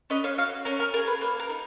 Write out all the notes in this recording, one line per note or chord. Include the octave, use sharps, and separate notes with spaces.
C#4 B4 D#5
C#5 F5
F#4 C#5 F5
C#4 A#4 C#5
A#4
F4 A#4
G#4
B4
A#3 B4
A#4
D#4